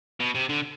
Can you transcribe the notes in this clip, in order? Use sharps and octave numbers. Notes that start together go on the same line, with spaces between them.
B2
C3
D3